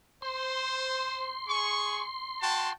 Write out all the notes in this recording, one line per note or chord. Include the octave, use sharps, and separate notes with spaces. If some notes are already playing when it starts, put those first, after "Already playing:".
C5 C6
G#4 C#6
F#4 G5 A5